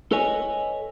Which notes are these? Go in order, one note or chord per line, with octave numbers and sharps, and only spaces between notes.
A4 B4 C#5 D#5 G#5